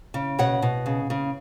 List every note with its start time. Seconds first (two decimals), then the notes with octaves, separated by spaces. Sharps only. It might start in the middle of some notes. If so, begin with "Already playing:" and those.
0.14 C#3
0.39 B2 C#5 F#5
0.62 B2
0.86 C#3
1.10 C#3